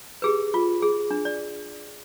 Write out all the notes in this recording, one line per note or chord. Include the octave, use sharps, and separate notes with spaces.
G4 G#4 B4
F4
G#4
D4
D5